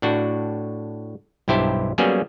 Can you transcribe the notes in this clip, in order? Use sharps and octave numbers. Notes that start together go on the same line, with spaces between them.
A2 D4 F#4
B1 G2 E4 G4 C5 A5
F#3 G3 A#3 B3 C#4 G#4